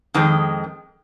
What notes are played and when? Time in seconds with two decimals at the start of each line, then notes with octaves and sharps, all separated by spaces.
0.14 F2 D#3 G#3